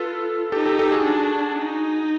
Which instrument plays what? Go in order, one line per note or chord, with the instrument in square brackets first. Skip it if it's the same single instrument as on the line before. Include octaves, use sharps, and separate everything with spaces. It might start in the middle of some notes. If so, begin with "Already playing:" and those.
Already playing: [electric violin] F4 [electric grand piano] A4 B4
[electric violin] D#4 [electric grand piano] G4 A4
[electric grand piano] G4 A4
G4 A4
F#4 G#4
[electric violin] D4
D#4